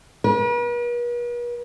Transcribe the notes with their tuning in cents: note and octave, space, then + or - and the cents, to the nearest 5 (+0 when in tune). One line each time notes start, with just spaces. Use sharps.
B4 -45